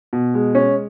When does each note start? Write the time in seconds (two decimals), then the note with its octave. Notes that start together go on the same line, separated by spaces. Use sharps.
0.13 B2
0.34 G#3
0.55 C#4